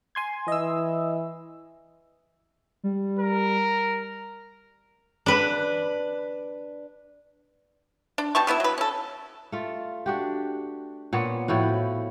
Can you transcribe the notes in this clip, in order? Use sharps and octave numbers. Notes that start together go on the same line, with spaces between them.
G#5 C6 G#6
E3 D#5 E6
G3
A#4
D4 B4
D4
B2 G3 A5 C#6
E3 B3 E4 E5
F#3 B4
C#4 A4
A3 F4
D4 F#4 G4
A#2 B3 C#5
A2 F3 E4 F#4